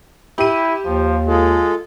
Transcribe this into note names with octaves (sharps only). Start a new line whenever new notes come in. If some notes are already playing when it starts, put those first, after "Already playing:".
E4 G4 D#7
D#2 F3
G#3 F4 A4